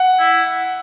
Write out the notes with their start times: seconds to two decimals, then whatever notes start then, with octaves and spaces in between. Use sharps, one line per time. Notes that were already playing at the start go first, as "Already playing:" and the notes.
Already playing: F#5
0.19 E4